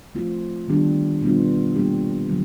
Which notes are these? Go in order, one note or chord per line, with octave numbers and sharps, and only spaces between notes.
F3 A3 C4 F4
D#3 G3 B3 D4 G4
B2 G3 B3 D4 F4
G3 A#3 D4 G4
D3 F#3